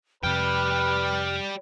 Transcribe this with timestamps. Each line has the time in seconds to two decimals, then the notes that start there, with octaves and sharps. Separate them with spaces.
0.23 F2 C3 G3 B4 G5 F6